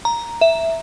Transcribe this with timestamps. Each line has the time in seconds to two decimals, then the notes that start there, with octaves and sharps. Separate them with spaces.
0.05 A#5
0.41 E5